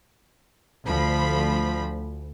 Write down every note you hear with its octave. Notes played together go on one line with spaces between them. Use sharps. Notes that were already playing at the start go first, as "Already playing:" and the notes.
D2 F3 B5